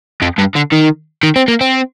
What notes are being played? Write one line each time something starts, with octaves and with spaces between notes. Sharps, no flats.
F2
G2
D3
D#3
D#3
C4
A#3
C4